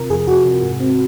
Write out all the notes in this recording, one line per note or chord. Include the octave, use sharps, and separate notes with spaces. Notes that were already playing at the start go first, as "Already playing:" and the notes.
Already playing: C3 F4 A#4
F2 G#4
F2 F#4
C3
G#2
C4